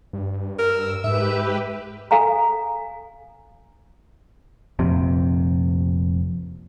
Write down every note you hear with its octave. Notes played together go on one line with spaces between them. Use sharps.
G2
A#4 E6
G#2 G4 B4 E5
A4 F5 G#5 A#5
F1 A#1 F2 C3